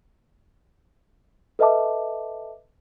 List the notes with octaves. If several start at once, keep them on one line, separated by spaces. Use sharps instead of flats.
A4 B4 D#5 E5 A5 D6